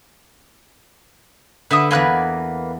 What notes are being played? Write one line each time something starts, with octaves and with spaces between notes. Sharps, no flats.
D3 B4 E5 D#6
E2 A#3 B4 D5 G#5 F#6